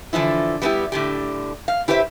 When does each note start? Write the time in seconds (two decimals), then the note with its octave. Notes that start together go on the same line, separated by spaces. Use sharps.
0.13 D3 E3 F3 E4
0.62 G3 A#3 B3 C#4 E4 G4
0.92 A2 D3 G4
1.68 F5
1.88 E4 G4 B4 C5 E5